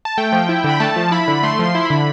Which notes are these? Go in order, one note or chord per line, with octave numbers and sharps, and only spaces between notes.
A5
A3 G5
F3
E4
D3 B5
A3 A5
F3
E4 B5
D3
A3 C6
F3 C6
E4
D3 B5